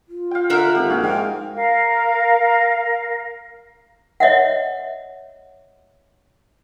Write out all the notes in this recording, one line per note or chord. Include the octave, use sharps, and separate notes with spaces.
F4
F5 G5
D3 A#4 E5 F#5
G#1 G4
A#1 F#4 G#4 F5
G#2 G5
A#4 F5
C#5 D#5 E5 F#5